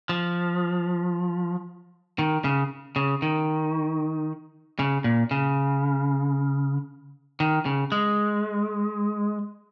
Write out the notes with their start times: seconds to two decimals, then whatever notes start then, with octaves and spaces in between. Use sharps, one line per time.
0.09 F3
2.19 D#3
2.44 C#3
2.96 C#3
3.22 D#3
4.79 C#3
5.04 A#2
5.31 C#3
7.40 D#3
7.65 C#3
7.92 G#3